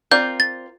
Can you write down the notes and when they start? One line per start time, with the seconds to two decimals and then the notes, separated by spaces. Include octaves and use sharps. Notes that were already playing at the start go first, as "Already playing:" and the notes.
0.11 C4 F4 A#4 D5 G6
0.40 A6